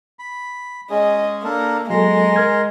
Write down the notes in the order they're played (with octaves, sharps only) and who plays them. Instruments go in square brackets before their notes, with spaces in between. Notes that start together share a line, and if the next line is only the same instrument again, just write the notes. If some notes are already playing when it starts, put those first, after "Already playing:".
[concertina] B5
[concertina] G#3 C#4 G#4 [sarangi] D#5
[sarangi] A#3 [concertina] D4 A4 A#4
[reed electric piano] F#3 A#3 A4 [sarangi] G#3 [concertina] A#5 C6
[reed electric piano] A#4 F6 G#6